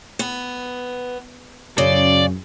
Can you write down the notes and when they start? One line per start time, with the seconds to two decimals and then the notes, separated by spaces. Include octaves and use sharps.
0.19 B3
1.78 F#2 C#3 D5